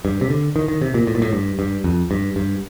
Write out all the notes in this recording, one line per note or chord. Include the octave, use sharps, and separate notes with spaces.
G2
C3
D3
D#3
D#3
C3
A#2
A2
A#2
A2
G2
G2
F2
G2
G2